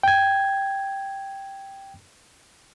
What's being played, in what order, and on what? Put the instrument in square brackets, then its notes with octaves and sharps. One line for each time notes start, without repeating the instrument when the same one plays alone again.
[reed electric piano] G5 G#6